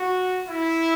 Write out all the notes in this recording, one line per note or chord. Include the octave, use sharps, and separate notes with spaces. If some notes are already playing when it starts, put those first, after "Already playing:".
Already playing: F#4
E4